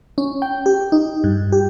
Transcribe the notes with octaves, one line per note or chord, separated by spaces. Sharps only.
C#4
G5
G4
D#4
G2
G4